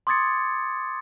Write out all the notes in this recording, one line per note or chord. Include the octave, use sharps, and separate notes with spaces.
C6 D6 D#6 G#6 A6 C#7